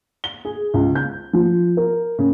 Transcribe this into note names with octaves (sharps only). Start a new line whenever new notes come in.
G7
G#4
C#2
G6
F3
A#4
C#3